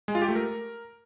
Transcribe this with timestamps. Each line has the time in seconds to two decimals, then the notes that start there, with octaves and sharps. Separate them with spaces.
0.08 G#3
0.15 F4
0.22 G4
0.29 A3
0.35 A#4